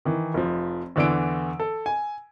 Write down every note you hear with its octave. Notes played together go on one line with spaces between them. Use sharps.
D#3 E3
F1 F3
E2 D3 E3 D5 E6 D7
A4
G#5